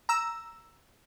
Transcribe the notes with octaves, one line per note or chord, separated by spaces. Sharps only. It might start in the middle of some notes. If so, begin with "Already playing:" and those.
A#5 E6